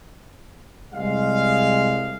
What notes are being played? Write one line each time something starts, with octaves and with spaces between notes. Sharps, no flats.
C2 G#3 F5